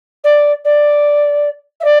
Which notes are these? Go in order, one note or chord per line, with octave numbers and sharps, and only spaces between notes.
D5
D5
E5
D5